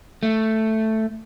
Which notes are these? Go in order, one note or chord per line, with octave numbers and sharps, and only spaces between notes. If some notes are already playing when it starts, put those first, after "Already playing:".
A3